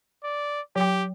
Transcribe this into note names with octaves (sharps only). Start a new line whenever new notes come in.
D5
F#3 G4 G5